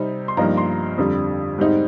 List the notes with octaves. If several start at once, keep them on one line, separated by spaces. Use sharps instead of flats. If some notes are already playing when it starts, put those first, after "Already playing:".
Already playing: C3 G3 C4 D#4
C6
G2 F3 A#3 D#4 A#5
C6
F2 D3 G3
G#2 G3 C4 D#4